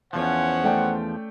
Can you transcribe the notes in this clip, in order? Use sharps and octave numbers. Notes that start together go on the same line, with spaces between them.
E2 F3 C#4 C5 C#5 F#5
A3 D5 G5